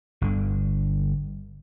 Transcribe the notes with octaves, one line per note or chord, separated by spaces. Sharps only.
G1 D3